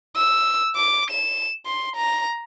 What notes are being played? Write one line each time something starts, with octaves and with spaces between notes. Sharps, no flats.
E6
D6
E7
C6
A#5